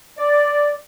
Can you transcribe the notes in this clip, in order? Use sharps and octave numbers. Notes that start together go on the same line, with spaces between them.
D5